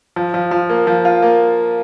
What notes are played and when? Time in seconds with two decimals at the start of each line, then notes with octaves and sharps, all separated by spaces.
0.16 F3
0.34 F3
0.51 F3
0.69 A#3
0.87 F3
1.05 F4
1.22 A#3